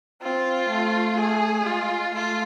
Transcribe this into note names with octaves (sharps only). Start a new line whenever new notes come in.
C4 F4
A3
A3 G#4
G#3 F4
A3 F4